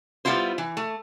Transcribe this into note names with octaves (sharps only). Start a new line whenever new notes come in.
G3 B3 E4 F4 C5
E3
A3